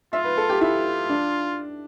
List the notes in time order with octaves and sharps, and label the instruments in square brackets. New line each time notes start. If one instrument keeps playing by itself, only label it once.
[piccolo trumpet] F4 [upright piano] E5
[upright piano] B4
A4
G4
[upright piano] E4 [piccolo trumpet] F4
[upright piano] D4